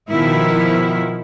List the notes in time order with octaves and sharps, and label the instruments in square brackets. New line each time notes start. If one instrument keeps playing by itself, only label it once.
[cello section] B2 D#3 F3 E4